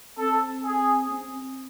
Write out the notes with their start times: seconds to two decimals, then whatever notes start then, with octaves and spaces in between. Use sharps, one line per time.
0.18 C4 A4
0.64 G#4
1.11 C4